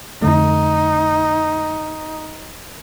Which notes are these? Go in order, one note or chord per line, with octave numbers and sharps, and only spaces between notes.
F2 D3 A3 D#4